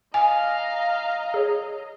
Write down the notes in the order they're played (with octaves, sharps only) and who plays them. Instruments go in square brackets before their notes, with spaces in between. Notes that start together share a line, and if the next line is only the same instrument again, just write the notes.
[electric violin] D#5 A#5 [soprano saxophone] F5 [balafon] G#5
[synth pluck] G#4 C#5